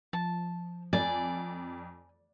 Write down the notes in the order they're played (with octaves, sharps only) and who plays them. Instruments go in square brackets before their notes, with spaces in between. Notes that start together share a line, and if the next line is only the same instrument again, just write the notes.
[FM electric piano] F3 [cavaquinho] A5
[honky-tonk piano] F2 [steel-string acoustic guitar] D5 [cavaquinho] G#5